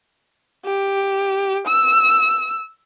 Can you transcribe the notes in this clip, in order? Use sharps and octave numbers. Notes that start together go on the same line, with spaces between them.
G4
E6